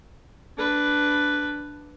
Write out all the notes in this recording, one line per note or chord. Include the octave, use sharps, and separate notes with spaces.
D4 B4